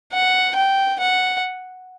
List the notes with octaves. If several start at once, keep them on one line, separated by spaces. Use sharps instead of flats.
F#5
G5
F#5